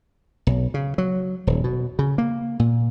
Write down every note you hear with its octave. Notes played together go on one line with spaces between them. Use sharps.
B1
C#3
F#3
D#1
B2
C#3
A#3
A#2